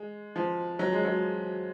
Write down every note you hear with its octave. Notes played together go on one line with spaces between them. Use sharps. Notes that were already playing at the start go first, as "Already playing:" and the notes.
Already playing: G#3
F3
F#3
G#3
F#3